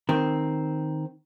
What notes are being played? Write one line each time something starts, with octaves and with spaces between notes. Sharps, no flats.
D#3 C4